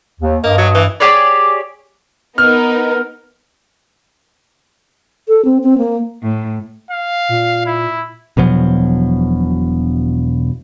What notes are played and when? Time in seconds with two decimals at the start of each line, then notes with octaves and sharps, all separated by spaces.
0.21 D#2
0.44 G2 A#3 D#5
0.58 F#3
0.75 E3
1.00 G4 G#4 C#5 D5
2.38 B3 D#4 A#4 F6
5.28 A4
5.45 C4
5.63 C4
5.78 A#3
6.23 A2
6.91 F5
7.29 A#2
7.66 E4
8.37 E1 B2 F3 F#3